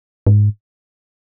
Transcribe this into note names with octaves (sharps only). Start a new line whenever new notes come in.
G#2